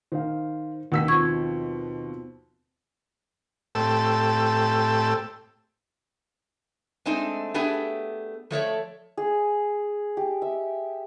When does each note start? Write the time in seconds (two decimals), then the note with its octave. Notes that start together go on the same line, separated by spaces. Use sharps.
0.12 D#3 C5 F5
0.92 D#2 B2 F#5 E6 B6
1.08 F3 C4 C#6 G#6
3.75 A2 A3 C4 G4 A4 E6
7.06 G#3 A3 C4 D4 D#4
7.54 A3 B3 D4 G4 G#4 D5
8.51 F3 A3 C#5 D5
9.17 G#4
10.17 G4
10.42 E5